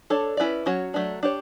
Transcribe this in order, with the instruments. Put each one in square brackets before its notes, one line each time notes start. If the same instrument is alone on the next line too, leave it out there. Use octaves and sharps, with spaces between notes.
[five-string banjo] D4 A4 C#5
C#4 E4 B4 D5
F#3 C#4 F#4 C#5
F#3 A3 D4
D4 G4 C#5